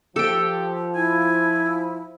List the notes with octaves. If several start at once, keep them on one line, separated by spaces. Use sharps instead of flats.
F3 G4 A4 G5
E4 G#5